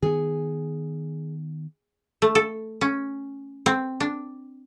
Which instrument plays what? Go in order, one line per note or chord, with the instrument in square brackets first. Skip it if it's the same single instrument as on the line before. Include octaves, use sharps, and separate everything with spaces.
[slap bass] D#3 B3 [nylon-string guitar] G#4
[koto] A3
A4
C#4
C4
D4